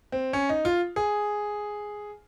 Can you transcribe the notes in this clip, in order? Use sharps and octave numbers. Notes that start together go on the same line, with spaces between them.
C4
C#4
D#4
F4
G#4